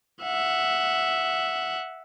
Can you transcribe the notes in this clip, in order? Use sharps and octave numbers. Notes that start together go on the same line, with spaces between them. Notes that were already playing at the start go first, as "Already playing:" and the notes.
E5 F#5